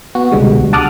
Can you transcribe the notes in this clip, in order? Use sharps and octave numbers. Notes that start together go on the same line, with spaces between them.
B3 F#4
C2 B2 D3 G3 G#3
D2
F#5 A5 D6 D#6 F6 F#6